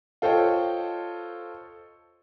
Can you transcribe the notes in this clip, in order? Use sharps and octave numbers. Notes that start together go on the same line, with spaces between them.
F4 A4 C5 C#5 D#5 G5